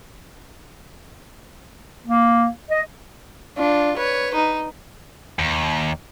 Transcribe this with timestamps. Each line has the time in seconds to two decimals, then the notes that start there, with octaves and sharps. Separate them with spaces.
2.07 A#3
2.71 D#5
3.58 D4 F4
3.98 B4 C#5
4.34 D#4
5.39 D#2